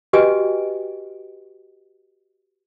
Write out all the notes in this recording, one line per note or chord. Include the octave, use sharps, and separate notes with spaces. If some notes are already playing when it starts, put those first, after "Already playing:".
F#4 G4 B4 D#5 G5 G#5